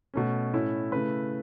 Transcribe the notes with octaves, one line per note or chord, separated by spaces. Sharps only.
B2 A3 C#4
A2 A3 C#4 E4
C#3 A3 E4 B4